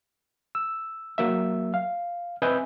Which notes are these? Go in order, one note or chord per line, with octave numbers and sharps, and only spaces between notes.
E6
F#3 A#3 E5
F5
C4 B4 D#5 E5 G#5 G6